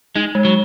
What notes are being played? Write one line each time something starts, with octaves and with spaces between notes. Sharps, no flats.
G#3 D#4
G#3
F#3